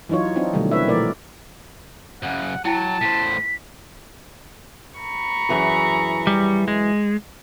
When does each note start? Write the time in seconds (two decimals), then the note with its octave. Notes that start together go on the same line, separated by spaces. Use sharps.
0.09 E3 F#3 D#4 F4 C#5
0.35 C4 D4 D#4 F4
0.53 B2 D3 D#3 F#3 G3 A3
0.71 C4 E4 B4 C#5 E5
0.88 A#2 E3 F3 A3 A#4 D5
2.22 F#2 C#3 F#5
2.65 F#3 E4 G5 A5
3.01 A2 C5 B6
4.99 A#5 B5 C#6
5.49 F#2 E3 G#4
6.27 G3
6.68 G#3